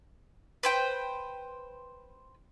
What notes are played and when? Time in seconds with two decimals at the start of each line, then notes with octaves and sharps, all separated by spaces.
0.63 B4 C5 G5